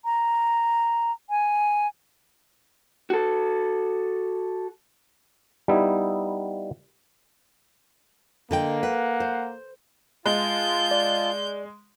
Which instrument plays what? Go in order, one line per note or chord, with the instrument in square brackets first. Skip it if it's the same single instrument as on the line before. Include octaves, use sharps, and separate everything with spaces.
[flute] A#5
G#5
[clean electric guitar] F#4 A4
[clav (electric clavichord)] G3 B3 D#4 E4
[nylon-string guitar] D3 D#5 G5 [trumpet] A#3
[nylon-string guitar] B4 [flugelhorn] F#5
[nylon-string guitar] C5
[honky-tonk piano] G#3 [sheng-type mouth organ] F4 A5 [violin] G6
[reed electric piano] D5